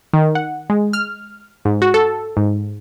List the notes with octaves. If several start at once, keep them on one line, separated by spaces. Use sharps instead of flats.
D#3
F#5
G#3
F6
G#2
F#4
A4
G#2